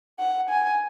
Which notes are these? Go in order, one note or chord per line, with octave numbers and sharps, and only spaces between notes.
F#5
G#5